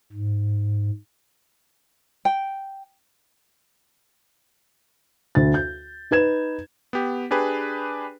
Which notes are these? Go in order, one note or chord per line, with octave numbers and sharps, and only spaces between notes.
G#2
G5
D2 A6
G6
D#4 B4 G#6 E7
B3 G4
D4 G4 G#4 B4